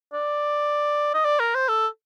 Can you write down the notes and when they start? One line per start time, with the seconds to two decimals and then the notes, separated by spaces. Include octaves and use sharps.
0.13 D5
1.14 D#5
1.25 D5
1.40 A#4
1.55 C5
1.69 A4